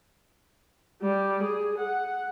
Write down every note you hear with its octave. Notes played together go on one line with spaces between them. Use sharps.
G3
G#4
F#5